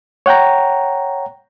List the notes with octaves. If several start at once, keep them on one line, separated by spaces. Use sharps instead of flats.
C#5 F#5 G5 A#5